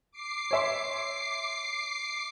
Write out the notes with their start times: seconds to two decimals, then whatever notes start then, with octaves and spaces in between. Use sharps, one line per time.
0.11 D6 C7
0.51 C#5 E5 C6